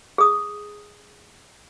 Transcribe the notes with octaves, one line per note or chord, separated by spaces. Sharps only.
G#4 D#6